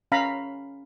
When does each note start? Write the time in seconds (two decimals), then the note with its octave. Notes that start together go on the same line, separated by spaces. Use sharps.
0.12 C#4 F5 A#5 B5